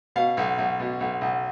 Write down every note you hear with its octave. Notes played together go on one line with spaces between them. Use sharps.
B2 F5
B1
B1
B2
B1
B1